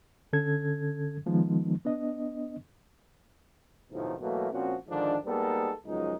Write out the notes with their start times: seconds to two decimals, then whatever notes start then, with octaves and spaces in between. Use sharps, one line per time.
0.33 D3 C#4 A4 G#6
1.26 D#3 F3 G#3 B3 D#4
1.85 B3 D4 D#5
3.91 B1 F2 A2 C3 D#3 F3
4.20 B2 E3 F#3 A3 A#3
4.51 A#2 F3 C4 C#4 F#4
4.89 G#2 D3 D#3 F3 D4
5.26 G3 G#3 A#3 B3 D#4 A4
5.85 C#2 F#2 F3 F#3 G#3 D#4